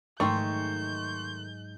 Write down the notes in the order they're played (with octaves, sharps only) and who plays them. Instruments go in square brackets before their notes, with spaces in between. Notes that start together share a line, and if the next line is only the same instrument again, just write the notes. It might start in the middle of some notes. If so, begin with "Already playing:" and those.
[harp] G#2 F#3 G#3 [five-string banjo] D#3 A3 [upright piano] C6 C#6 [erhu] G6